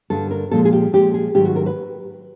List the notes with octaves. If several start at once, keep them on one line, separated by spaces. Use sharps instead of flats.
G2 D3 G3 A4
A#4
A#2 F3 G#3 A4
G#4
G4
A#2 F3 G#3 G4
G#4
G#2 D#3 F#3 A3 G4
F#4
A#4
B4